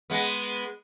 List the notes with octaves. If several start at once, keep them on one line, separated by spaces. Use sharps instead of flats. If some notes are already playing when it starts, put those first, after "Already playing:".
G#3 B3